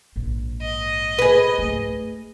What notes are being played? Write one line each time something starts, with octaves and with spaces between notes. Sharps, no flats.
A#1 G#2
D#5
G#4 B4
G#2 A3